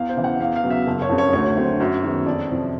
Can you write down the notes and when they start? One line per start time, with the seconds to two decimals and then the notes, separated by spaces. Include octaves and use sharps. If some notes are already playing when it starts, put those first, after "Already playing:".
Already playing: E2 F5
0.09 C5
0.16 C#3 E3
0.24 F#5
0.40 E2 F5
0.56 F5
0.64 C#3 F#3 B3
0.70 E5
0.87 F#1
1.02 C#5
1.09 F2 C#3
1.18 C#5
1.33 D2 C#5
1.57 D3 F#3 A3 C4
1.80 F#2
2.04 D#3 G#3 B3
2.26 F2 D5
2.50 C3 F3